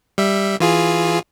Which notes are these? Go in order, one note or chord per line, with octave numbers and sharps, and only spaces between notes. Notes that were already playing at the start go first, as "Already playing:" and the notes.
G3 E5
E3 F4 G#4